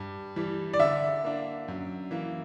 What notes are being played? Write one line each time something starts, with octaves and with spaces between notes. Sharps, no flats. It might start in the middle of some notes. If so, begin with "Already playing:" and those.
Already playing: G2
E3 G3
D5
D3 E5
A#3 D4
F#2
E3 A#3